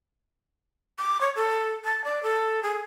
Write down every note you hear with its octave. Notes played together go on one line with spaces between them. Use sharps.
D6
C#5
A4
A5
D5
A4
G#4